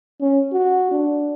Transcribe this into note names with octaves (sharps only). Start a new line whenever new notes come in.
C#4
F#4
D4